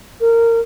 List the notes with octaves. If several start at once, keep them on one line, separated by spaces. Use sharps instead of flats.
A#4